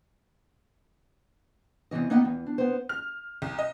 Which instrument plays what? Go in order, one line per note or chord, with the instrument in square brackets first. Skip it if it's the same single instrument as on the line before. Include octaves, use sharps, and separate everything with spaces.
[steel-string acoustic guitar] E2 G2 C3 E3 D#5
A#3 B3 D#4 D#5 F#5 G5
E2
D4
B3 C5
[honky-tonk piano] F6
C2
D#5